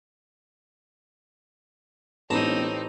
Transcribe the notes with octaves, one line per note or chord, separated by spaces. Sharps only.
E1 A1 C4 D#4 C#5 A5 A#5